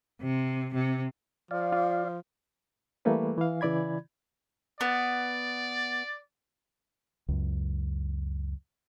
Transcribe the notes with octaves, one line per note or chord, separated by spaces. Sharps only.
C3
C3
F3 D5 F5
F4
E3 G3 A3 A#3 A4 B4
E3 F5
C#3 E3 E4 D5 B5 G#6
B3 D5
C#2 F#2